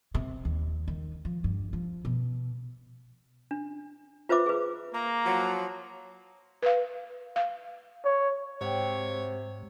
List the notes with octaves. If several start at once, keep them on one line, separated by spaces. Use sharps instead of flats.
C3
D#2
D#3
F3
G2
F3
B2
D4
F4 B4 C5 E5 D6
G#4 B4
A#3 A#5
F3 F#3
B4 F5
F5
C#5
G#2 C3 C4 F#4 C#5